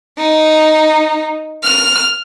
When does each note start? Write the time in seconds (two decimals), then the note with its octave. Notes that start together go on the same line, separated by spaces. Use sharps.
0.18 D#4
1.63 F6